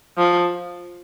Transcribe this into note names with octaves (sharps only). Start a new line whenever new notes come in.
F3